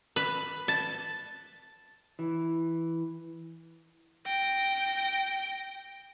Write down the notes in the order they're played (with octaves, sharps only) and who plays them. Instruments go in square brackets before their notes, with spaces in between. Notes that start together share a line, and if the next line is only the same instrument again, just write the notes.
[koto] B4
A5
[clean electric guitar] E3
[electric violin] G5 A#6